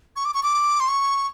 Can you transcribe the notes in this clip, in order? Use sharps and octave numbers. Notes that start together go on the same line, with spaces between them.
C#6
D6
C#6
D6
C6
C#6